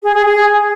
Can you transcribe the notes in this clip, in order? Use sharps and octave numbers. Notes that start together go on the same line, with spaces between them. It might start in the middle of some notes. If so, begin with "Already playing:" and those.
G#4
G#4
G#4